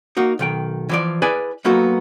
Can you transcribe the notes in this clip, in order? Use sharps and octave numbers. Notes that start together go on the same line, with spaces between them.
A#3 D#4 F#4
B1 D#3 G5
E3 F3 D5
E4 G#4 B4 D5 G#5
F#3 A#3 B3 D#4 F#4 A4